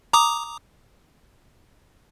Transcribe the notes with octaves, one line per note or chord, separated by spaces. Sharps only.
A#5 D6 D#6